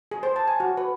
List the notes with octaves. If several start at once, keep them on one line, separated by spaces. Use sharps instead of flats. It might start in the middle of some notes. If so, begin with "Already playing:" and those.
G#4
C5
A5
G#5
F#4
B4